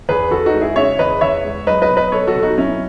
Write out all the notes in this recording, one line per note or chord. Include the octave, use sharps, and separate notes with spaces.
E2 G#4 B4
E2 F#4 A4
D#4 F#4
G#3
E4 G#4
C#3 C#5 E5
E2 B4 D#5
E2 C#5 E5
G#3
F#3 B4 D#5
B4 D#5
B2
B4 D#5
F#3 A4 C#5
F#4 A4
B2
D#4 F#4
F#3 C#4 E4